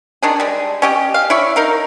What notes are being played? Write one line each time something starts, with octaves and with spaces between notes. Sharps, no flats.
D#3 D4 G#4
G3 G#3
C#4 G4 D#5
F5
E4 C#5 D5 E5
D#4 A#4 F5